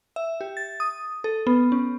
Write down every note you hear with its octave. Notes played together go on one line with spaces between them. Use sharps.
E5
G4
A6
D#6
A4
B3
C#4